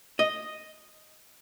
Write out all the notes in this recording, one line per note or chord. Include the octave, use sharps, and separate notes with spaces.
D#5